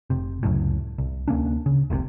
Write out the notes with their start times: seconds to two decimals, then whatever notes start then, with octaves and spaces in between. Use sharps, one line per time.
0.10 F1 C3
0.43 C#2 F#2 A2
0.98 C2
1.28 D2 A#3 C#4 D4
1.66 C#3
1.90 F1 C2 G#2 C3